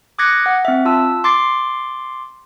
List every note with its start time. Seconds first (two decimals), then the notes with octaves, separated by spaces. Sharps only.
0.19 D6 D#6 F#6 G#6 A#6 C#7
0.46 F#5
0.65 C4 E5
0.85 F4 A5 E6
1.24 C6 D6 A6 C7